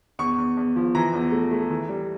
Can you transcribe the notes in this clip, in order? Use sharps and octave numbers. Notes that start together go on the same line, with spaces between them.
E2 C#6
E2
E2
F3
E3 A#5
E2
A3
A3
E3
G3